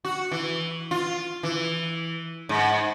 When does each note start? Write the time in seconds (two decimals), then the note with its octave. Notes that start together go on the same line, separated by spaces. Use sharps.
0.05 F#4
0.32 E3
0.91 F4
1.43 E3
2.49 G#2